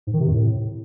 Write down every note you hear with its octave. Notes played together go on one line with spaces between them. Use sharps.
G#2
D#3
C3
F2
A2